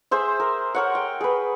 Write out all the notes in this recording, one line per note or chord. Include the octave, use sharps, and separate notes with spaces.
G#4 C5 E5
A#4
A#4 C#5 F#5
G5
G#4 B4